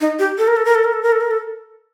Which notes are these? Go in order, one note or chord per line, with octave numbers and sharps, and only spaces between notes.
D#4
G4
A4
A#4
A4
A#4
A4
A#4
A4
A#4
A4
A#4
A4